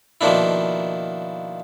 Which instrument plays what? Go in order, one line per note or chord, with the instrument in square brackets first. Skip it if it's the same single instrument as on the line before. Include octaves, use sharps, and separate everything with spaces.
[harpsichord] B2 D#3 F3 A#3 D4 E4